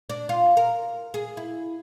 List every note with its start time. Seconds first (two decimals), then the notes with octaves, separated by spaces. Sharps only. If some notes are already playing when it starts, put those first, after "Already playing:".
0.10 D4
0.29 F4
0.57 A#4
1.14 G#4
1.37 E4